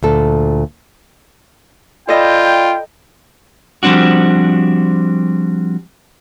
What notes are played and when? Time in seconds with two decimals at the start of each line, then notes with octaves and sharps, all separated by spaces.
0.03 D2 A#2 A4
2.09 F4 A4 D5 D#5 G5 B5
3.83 F3 G3 C4 D4 F#4